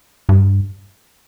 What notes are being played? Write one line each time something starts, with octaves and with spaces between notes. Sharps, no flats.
G2